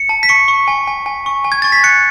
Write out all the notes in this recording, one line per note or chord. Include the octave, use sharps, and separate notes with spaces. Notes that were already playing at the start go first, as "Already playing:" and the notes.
Already playing: C#7
A5
B6
C#6 C#7
C#6
G#5
G#5
G#5
C#6
G#5
G#6
C#6 A6
B6
F#6 C#7